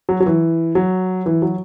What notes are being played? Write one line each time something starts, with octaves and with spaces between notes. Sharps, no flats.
F#3
F#3
E3
F#3
E3
F#3